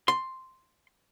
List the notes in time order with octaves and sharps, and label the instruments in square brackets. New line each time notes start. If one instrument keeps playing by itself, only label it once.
[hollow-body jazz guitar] C6